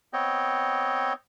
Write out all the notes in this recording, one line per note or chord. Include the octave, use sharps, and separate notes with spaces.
B3 C4 C#5 D#5 G5